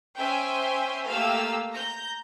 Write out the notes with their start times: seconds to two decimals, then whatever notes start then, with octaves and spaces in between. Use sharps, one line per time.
0.18 C#4 C5 E5 G5 G#5 C6
1.07 A3 A#3 G4 F5 E6
1.72 A#5 G6